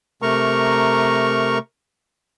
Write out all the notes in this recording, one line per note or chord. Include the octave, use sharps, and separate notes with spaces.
C3 A3 A#4 A#5 C#6